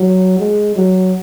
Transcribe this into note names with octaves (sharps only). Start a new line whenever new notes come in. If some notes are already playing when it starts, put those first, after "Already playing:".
Already playing: F#3
G#3
F#3